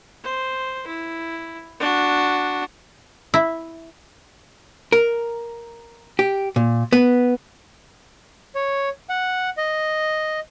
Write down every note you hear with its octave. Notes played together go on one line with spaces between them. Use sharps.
C5
E4
D4 F#4
E4
A#4
G4
A#2
B3
C#5
F#5
D#5